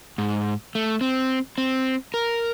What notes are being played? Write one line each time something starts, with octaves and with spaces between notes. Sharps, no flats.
G#2
A3
C4
C4
A#4